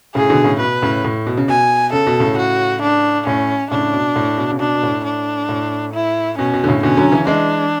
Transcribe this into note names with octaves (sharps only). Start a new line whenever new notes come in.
A2 C#3 G#4
B2 D3
A2 C#3
B2 B4
A2 C#3
A2
B2
C#3
B2 G#5
C#3 A4
B2
A2 C#3
F#4
D4
A2 C#4
A2 C#3 D4
B2
A2
B2
C#3
B2 D4
B2
A2
D4
A2
E4
B2 C#4
B2
D3
A2 C#3
B2 D3 C#4
D3 F#3
C#3 E3
E3 G#3 D4